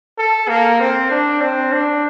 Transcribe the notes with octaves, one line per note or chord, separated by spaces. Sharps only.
A4
A#3
C4
D4
C4
D4